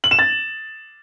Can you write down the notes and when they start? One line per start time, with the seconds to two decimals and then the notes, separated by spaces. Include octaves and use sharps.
0.04 F#7
0.11 E7
0.19 A6